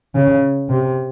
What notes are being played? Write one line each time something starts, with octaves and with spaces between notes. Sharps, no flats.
C#3
C3